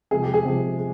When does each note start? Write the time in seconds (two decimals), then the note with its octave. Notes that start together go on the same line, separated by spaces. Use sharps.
0.11 C3 F3 G#3 G#4
0.23 G4
0.34 G#4
0.45 C3 F3 G#3
0.78 G#3